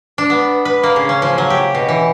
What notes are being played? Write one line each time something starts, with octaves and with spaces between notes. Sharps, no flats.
D4
B3
B4
A#3
C#3
C#4
F3
F#3
G4
B2
E3